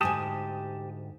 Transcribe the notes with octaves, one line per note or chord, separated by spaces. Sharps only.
D2 G#2 G4 G#5 A5 D#6